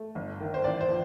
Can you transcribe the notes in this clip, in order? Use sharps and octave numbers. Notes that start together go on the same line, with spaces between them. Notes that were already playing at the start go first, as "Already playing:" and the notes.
Already playing: A3
G1
D#3
C5
A1 D5
C5
F3